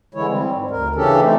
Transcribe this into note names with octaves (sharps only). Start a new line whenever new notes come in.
D3 E3 G#3 E4 C#5
G3 C4
G#2
D2 A#4
C#3 E3 C#4 D4 G4 A4
A3 C4 D#4